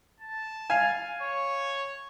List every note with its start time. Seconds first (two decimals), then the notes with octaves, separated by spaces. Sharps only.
0.20 A5
0.70 F5 G#5
1.23 C#5